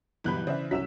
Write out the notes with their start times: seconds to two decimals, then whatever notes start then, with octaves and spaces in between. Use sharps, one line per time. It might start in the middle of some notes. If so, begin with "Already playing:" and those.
0.24 G1 B2 E3 F#3 G3 B5 F#6 G6
0.47 C#3 C5 D5 E5
0.71 C2 F#3 C#4 E5 E6 B6 E7